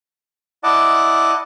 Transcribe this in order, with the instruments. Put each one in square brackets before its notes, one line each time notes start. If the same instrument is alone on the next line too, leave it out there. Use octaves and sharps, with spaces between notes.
[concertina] E4 D5 D#5 F#5 A5 D6